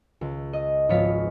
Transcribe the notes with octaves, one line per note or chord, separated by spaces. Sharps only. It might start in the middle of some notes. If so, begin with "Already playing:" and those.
C#2
D#5
G#1 F3 B3 C#5 F5 B6